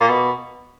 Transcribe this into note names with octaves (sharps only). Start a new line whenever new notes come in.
A#2
B2